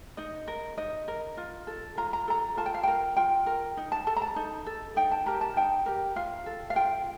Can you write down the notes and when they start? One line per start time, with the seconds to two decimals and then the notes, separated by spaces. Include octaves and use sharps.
0.17 D#4 D#5
0.48 A#4
0.78 D#4 D#5
1.08 A#4
1.37 F4
1.67 A4
1.97 F4 A#5
2.13 A#5
2.28 A4 A#5
2.57 F4 A5
2.66 G5
2.74 F5
2.83 A#4 G5
3.16 F4 G5
3.46 A#4
3.77 D#4
3.92 A5
4.07 A4 A5
4.16 A#5
4.22 A5
4.36 D#4
4.66 A4
4.96 D#4 G5
5.12 A5
5.26 G4 A#4 A#5
5.41 A5
5.56 D#4 G5
5.86 G4 A#4
6.16 F4 F5
6.46 A4
6.70 F5
6.76 F4 G5